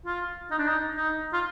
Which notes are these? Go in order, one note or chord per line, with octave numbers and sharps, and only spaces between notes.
F4
D#4
D4
D#4
D#4
F4